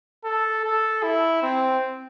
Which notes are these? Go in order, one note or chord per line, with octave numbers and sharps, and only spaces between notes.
A4
A4
E4
C4